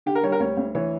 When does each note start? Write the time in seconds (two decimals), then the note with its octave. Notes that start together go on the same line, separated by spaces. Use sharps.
0.06 D3 G4
0.15 A#4
0.23 G3 C#5
0.32 A#4
0.40 D2 C#5
0.57 D2
0.75 E3 C#5